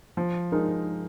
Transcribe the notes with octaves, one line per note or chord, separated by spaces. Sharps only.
F3
G#3 D#4 A#4